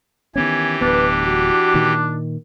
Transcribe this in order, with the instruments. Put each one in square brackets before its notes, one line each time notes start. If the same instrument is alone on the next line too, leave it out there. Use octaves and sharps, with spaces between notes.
[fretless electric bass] D#3 B3 C#4 [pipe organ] E3 G4 [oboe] G#5
[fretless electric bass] D1 B3 [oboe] D4 [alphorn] B4
[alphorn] F#4
[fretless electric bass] A#2 D#3